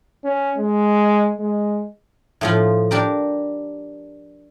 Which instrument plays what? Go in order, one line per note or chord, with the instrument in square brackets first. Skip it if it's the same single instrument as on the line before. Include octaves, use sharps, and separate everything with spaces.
[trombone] C#4
G#3
G#3
[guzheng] A2 F3 F4
D4 G4 A#4